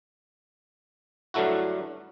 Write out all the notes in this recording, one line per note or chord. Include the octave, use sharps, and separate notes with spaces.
G2 D3 F#3 A3 E4 F#4